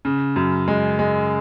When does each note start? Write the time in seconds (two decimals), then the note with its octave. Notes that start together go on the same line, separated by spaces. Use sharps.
0.05 C#3
0.36 F#2
0.68 G#3
0.99 G#3